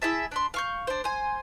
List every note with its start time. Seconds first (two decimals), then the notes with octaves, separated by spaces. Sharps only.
0.02 E4 G#4 E5 A5
0.31 D4 B5 C6
0.54 F5 C#6 G6
0.87 D4 C5
1.04 C5 G#5